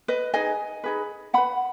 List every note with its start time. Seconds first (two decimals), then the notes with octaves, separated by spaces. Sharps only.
0.08 B4 D#5
0.34 D#4 G#4 B4 D#5 G#5
0.84 D#4 G#4 B4
1.33 C#4 B4 F#5 B5